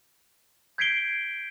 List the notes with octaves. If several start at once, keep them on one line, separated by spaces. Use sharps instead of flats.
G6 G#6 B6 C7 D7 G7